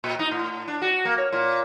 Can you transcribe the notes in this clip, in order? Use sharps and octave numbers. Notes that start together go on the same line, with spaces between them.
A#2
D#4
A2
D4
F#4
A#3
C#5
A#2